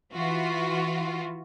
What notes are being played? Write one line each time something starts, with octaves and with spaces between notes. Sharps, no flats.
E3 F4 F#4